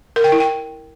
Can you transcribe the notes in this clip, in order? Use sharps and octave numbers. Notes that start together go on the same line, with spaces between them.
A#4
G5
E4
G5